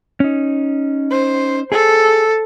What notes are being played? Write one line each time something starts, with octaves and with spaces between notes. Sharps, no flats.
C#4 D#4
C5
G#4 A4